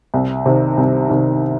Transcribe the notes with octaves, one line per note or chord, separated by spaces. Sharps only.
C2
C3 D#3
C2
C3 D#3